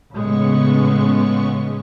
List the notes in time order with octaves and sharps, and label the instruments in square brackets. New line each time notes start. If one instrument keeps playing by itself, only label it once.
[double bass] A2 G#3 [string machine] C#3 B3 C#6